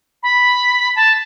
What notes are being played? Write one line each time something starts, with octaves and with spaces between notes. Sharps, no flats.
B5
A5